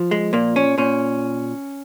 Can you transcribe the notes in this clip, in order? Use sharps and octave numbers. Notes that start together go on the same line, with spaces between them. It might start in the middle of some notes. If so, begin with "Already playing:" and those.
Already playing: F3
G#3
A#2 A#3
C#4
A#2 C#4